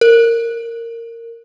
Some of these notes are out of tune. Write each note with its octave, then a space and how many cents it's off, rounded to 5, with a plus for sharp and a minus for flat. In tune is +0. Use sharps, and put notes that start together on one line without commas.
A#4 -15